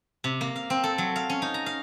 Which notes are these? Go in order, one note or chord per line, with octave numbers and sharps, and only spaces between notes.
C3
A#3
F5
C4
A4
F#3
F5
C#4
D#4
A#5
F5